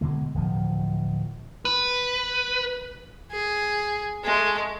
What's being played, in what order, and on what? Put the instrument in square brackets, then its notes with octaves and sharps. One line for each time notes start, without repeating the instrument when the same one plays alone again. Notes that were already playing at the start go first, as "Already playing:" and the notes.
[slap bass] B2 D3 G#3
D1 F3
[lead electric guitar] B4
[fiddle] G#4
G#3 A3